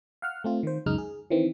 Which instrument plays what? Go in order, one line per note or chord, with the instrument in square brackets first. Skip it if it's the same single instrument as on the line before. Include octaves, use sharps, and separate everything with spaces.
[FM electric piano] F5 F#5 F6
A3 C4 F4
D#3 C5
C#2 F#2 G#3 D#4 F6
G#4
D#3 E3 C4